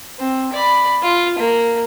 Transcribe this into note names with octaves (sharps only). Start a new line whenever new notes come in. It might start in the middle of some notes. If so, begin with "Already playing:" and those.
C4
D5 B5
F4
A#3